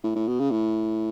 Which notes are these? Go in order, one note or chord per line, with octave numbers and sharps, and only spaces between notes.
A2
A2
B2
C#3
A2